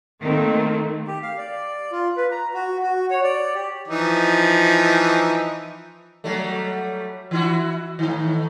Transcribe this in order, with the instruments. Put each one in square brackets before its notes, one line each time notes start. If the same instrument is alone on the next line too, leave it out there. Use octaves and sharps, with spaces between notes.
[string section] D#3 A3 A#3 C4
[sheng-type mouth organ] G4
F5
D5
F4
B4
A#5
F#4
F#4
C#5
D5
G4
[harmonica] E3 F3 D#4
[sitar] F#3 G3 A3
E3 E4 F#4
A2 D#3